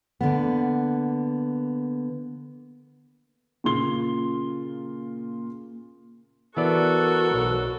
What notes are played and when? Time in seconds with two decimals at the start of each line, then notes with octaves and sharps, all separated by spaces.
0.21 D3 A#3 B3
3.64 A#2 C#3 F4 C6 G7
6.57 E3 B3 F#4 A4 A#4 D5
7.34 B1 F#3